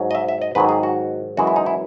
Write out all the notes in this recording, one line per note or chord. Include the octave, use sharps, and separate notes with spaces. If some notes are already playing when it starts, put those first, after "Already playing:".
Already playing: G#2 F#3
D#5
E5
E5
D#5
G#2 D#3 F#3 B4
G#4
F#4
F#2 E3 G#3 F#4
E4
D#4
E4